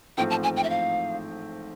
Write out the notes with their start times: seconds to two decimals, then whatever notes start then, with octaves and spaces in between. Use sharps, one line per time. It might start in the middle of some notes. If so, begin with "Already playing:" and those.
0.17 A1 G#2 F3 A3 C4 G5
0.30 A5
0.43 G#5
0.57 G5
0.64 E5
0.70 F5